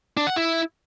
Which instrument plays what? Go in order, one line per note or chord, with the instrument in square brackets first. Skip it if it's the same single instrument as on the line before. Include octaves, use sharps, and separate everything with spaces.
[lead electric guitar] D4
F#5
E4